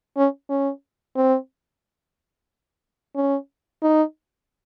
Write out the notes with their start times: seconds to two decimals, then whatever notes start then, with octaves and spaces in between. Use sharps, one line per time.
0.17 C#4
0.49 C#4
1.16 C4
3.15 C#4
3.82 D#4